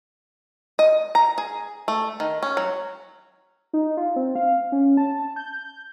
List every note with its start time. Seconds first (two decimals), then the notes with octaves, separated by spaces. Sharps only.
0.79 D#5
1.15 A#5
1.38 G#4
1.88 A3
2.20 D#3
2.43 C#4
2.57 F#3
3.73 D#4
3.97 F4
4.16 C4
4.35 F5
4.72 C#4
4.97 A5
5.36 G6